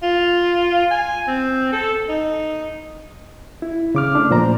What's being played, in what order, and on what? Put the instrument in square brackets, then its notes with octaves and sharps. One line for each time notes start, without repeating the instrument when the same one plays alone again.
[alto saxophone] F4
G#5
C4
A4
D#4
[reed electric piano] E4
C#3 D6 F6
A3 D4
A#2 F3 C5 D5 A#5